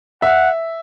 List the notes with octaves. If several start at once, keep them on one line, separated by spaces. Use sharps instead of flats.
E5 F#5